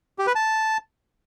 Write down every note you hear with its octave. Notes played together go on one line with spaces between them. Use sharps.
G4
B4
A5